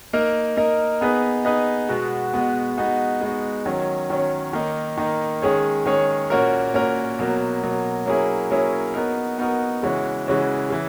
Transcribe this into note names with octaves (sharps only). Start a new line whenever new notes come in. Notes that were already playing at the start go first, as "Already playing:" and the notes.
A#3 D#4 A#4 D#5
A#3 D#4 A#4 D#5
B3 D#4 G#4 B4 D#5
B3 D#4 G#4 B4 D#5
B2 G#3 B3 F#4
B2 G#3 B3 F#4
G#3 B3 D#4 F#4
G#3 B3 D#4 F#4
D#3 F#3 C#4
D#3 F#3 C#4
D#3 A#3 D#4
D#3 A#3 D#4
D#3 G#3 C#4 G#4 C#5
D#3 G#3 C#4 G#4 C#5
A#2 A#3 C#4 F#4 A#4
A#2 A#3 C#4 F#4 A#4
B2 F#3 A#3
B2 F#3 A#3
F#3 A#3 C#4 E4 G#4
F#3 A#3 C#4 E4 G#4
B3 D#4 F#4 A#4
B3 D#4 F#4 A#4
C#3 E3 G#3 C#4 F#4
C#3 E3 G#3 C#4 F#4
C#3 E3